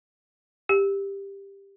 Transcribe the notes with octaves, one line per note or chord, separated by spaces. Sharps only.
G4